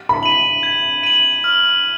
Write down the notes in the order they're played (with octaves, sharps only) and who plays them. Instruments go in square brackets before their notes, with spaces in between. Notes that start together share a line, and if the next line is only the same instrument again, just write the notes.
[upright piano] B5
[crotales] B6 D#7 F#7
G#6
D#7 F#7
F6